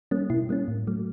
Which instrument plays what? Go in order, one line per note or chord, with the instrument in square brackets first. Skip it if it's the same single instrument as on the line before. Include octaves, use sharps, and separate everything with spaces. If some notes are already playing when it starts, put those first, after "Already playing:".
[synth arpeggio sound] G3 A#3 C#4
B2 E4
G3 A#3 C#4
A2
F#3 A3